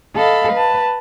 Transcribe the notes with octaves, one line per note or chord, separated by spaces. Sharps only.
A4 D#5 F5 B5
B4 A5